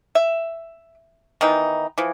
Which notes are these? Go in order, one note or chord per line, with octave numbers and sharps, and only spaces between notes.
E5
D#3 E3 B3 D#4
E3 F3